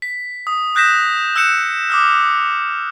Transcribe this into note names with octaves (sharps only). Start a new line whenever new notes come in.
B6
D#6
D#6 F#6 G6 A#6 B6 E7
E6 F#6 G6 C#7 E7
D6 D#6 F6